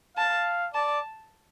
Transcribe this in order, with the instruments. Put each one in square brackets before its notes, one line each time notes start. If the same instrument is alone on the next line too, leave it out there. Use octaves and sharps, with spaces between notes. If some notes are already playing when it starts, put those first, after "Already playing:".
[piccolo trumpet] F5 [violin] A5
[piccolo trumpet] D5 [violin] A5